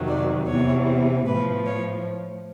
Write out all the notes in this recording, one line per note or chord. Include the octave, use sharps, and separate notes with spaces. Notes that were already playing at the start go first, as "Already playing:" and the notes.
Already playing: F2 C3 D#3 F#3
D5
E2 C3 E3 C#5
A2 F3 B4
C#5